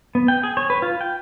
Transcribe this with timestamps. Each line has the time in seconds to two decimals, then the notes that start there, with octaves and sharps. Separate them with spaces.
0.15 B3
0.28 G5
0.43 G#4
0.57 C#5
0.70 B4
0.82 F4
1.01 G5